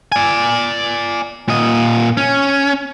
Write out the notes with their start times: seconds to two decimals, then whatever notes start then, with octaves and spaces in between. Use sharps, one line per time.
0.12 D5 G#5
1.48 A#2 D#5
2.17 C#4